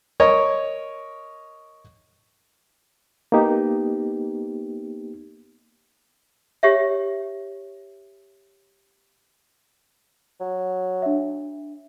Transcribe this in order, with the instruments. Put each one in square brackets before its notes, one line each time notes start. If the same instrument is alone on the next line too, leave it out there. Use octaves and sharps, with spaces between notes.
[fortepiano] A#4 C#5 D#5
[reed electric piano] A#3 B3 D#4 G4
[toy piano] G4 C#5 E5
[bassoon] F#3
[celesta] D4 E5